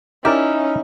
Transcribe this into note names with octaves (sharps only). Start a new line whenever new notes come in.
C#4 D#4 E4 G4 A#4 D5